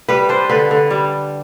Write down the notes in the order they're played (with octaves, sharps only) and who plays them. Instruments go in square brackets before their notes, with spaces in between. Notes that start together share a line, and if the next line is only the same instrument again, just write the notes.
[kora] G3 B4
D4 C5
D3 B4
D3
G3